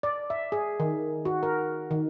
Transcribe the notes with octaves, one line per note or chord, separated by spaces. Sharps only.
D5
E5
G#4
D#3
F#4
A#4
D#3